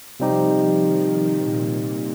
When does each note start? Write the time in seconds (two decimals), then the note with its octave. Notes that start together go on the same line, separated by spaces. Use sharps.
0.20 C3 F3 G3 C4 D#4 G4
0.80 D#3
1.40 A#2